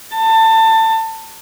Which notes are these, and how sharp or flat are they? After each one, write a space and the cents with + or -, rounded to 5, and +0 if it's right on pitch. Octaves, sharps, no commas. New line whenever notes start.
A5 +25